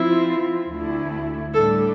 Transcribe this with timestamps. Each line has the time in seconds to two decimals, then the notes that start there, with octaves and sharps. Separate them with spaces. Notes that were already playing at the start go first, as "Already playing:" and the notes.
Already playing: F3 C4 E4 F4
0.68 D2 D3 A3 E4
1.53 A2 G3 D4 A4